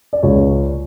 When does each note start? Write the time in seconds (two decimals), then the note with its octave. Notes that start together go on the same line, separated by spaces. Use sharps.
0.13 D5
0.23 C#2 C#5